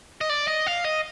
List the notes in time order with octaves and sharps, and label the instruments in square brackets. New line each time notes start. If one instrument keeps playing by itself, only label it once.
[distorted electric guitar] D#5
D5
D#5
F5
D#5